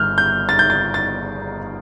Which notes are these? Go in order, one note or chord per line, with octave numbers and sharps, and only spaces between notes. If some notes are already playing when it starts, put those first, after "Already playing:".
Already playing: G1 G2 F6 G6
G6
A6
G6
A6
A6